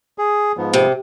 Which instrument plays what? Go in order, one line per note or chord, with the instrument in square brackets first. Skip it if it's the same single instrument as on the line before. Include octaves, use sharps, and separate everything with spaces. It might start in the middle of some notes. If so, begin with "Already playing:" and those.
[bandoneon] G#4
G#2 F3 B3
[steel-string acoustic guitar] C3